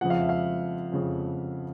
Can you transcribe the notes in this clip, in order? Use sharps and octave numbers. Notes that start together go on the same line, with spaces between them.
F2 C#3 F3 F#5
F5
E5
F5
F2 C#3 F3